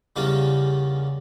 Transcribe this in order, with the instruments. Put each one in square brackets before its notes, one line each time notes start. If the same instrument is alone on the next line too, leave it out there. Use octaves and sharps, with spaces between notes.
[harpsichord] E2 C#3 G3 A#3 C#4